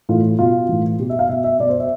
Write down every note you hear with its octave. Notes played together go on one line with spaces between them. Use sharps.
A2 E3 F4
B2 F4
A2 E3
B2 G4
E5
F5
B2 E5
E5
B2 D5
C5
E5